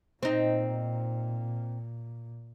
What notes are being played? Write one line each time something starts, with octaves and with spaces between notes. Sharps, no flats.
A#2 C4 D#4